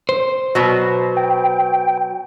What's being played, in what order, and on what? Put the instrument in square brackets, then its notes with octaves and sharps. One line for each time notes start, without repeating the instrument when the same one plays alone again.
[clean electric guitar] C5
[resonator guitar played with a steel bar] B2 F#3
[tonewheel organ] G5